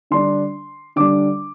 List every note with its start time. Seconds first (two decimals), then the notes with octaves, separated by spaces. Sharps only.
0.11 D3 G3 D4 C6
0.96 D3 G3 D4 D6